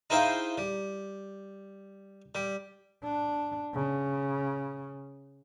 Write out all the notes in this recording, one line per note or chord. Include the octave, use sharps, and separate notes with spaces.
D#4 E4 G#4 C5 F5 G5
G3
G3
D4
C#3